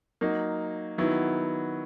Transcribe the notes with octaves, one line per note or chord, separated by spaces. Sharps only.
F#3 A#3 D#4
D#3 F#3 B3 E4